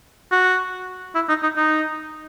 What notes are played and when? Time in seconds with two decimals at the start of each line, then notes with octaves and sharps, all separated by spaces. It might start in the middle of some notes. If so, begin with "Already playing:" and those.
0.32 F#4
1.15 E4
1.29 D#4
1.43 D#4
1.57 D#4